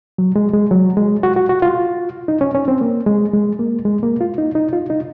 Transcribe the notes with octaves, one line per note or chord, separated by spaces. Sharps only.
F#3
G#3
G#3
F#3
G#3
F#4
F#4
F#4
F4
D#4
C#4
C#4
C4
A#3
G#3
G#3
A#3
G#3
A#3
F4
D#4
D#4
F4
D#4